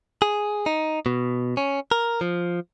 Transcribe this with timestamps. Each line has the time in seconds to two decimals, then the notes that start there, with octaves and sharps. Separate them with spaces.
0.22 G#4
0.66 D#4
1.06 B2
1.57 C#4
1.91 A#4
2.21 F3